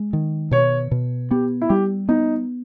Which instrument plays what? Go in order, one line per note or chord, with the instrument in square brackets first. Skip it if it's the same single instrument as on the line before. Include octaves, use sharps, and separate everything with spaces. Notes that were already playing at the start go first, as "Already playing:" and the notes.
Already playing: [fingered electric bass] G#3
D#3
[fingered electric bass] B2 [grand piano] C#5
[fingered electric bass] B2
[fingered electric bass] B3 [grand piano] G4
[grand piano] E4
[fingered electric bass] G3 [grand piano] G4
[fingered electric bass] B3 [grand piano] D#4